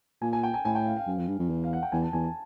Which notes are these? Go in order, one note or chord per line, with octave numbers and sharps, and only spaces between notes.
A#2 G#5
G#5
G5
G#5
A2 G#5
G5
F5
F5
F#2
F2
G2
F2
E2
F5
F#5
G5
E2 G#5
A5
E2 G#5
A5